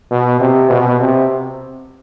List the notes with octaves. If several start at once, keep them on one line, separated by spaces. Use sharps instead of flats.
B2
C3
B2
C3